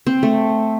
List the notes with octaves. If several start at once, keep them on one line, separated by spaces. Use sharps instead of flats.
C4
A3